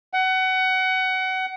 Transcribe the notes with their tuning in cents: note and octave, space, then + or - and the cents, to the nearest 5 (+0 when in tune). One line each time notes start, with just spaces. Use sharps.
F#5 +25